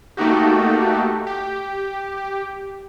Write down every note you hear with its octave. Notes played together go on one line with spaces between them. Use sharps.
A3 A#3 D#4 F#4 G4
G4